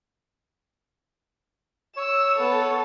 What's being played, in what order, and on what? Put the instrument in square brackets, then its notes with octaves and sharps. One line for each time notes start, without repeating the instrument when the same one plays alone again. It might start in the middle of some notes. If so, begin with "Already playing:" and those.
[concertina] C#5 [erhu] E6
[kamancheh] B3 [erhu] A4